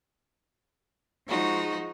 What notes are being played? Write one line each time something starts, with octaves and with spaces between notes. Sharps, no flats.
F3 G#3 D#4 F#4